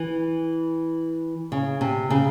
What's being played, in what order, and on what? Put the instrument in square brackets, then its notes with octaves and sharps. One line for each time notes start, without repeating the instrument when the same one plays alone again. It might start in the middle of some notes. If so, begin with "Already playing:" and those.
Already playing: [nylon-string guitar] E3
C#3
C3
C#3